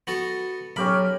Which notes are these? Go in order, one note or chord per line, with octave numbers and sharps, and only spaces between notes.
B3 F#4 A4
B1 C#4 G4 A#4 B5